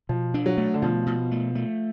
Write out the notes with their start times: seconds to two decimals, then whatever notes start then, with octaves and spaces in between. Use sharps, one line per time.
0.09 B2 F3
0.34 D4
0.46 F#3
0.57 A3
0.74 D3
0.82 B2 F3
1.06 B2
1.31 A3
1.55 A3